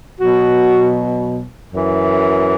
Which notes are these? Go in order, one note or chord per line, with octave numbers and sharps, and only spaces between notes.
B2 F#3 F#4
F#2 E3